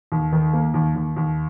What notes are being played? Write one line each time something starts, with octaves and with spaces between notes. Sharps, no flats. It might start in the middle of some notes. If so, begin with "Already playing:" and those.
D#2
D#3
A#3
D#2
D#2
D#2